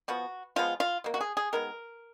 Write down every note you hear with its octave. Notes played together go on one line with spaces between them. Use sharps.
F3 B3 F#4
F3 G#3 B3 F4
F4
B2 A#3
F#4
G#4
G#4
D#3 G#3 B3 A#4